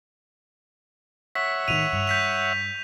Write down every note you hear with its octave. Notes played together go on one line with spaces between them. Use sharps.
C#5 E5 F#5 B6
A2 D#3 D#7 F7
G2
G6 B6 F7